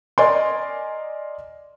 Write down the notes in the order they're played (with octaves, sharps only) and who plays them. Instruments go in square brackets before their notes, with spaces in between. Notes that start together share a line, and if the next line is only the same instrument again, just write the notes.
[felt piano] A#4 D5 D#5 G#5 C6